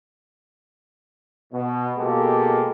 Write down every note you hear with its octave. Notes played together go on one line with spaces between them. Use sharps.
B2
B2 G#3 A#3 F4 G4 A4